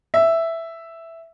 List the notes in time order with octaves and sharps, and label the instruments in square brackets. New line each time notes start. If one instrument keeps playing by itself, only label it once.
[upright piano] E5